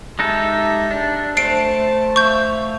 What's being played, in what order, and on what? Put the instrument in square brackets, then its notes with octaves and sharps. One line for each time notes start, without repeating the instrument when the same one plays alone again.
[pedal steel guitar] G#3 D#4 A4 [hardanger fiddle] G4 E5
[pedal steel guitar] D4
[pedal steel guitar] A3 [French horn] C5 [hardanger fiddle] A5 [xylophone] C7 D7
[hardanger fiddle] E5 F5 [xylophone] C#6 G6